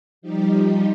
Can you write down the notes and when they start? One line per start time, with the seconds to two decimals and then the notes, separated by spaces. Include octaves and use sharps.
0.22 F3 G3 D#4 G4